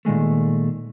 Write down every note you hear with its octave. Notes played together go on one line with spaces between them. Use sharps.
A#2 D#3 G#3 A3